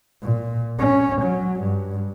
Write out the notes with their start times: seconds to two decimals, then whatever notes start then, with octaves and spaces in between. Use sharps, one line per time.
0.22 A#2
0.79 C#4
1.22 F#3
1.60 G2